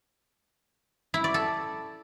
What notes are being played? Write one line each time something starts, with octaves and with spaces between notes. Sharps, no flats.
E4
D5
A4